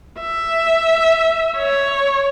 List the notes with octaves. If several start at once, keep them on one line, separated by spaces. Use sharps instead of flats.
E5
C#5